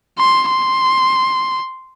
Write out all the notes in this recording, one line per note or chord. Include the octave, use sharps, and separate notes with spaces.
C6
C6